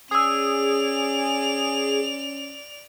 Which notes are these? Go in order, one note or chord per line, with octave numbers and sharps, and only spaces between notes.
C#4 G#4 D5 D#6 E6 F7